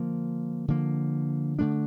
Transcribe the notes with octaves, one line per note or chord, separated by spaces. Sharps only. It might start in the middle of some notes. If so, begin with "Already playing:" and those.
Already playing: D3 F3 A#3
D3 F3 A#3
D3 F3 A3 D4